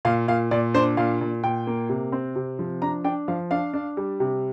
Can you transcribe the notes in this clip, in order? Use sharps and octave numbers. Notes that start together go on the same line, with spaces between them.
A#2 F5
A#2 F5
A#2 D5
D4 C5
A#2 F5
A#2
A#2 G5
A#3
C3
C4
C3
F3
D4 A#5
D4 G5
F3 F5
D4 F5
D4
G3
C3